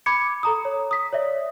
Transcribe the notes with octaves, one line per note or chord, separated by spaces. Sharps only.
B5 D6 G#6 C#7
A4 A#5 D#6
C#5
D#6 B6
C#5 D5 E5